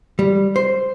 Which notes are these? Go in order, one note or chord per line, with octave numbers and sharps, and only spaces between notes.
G3
C5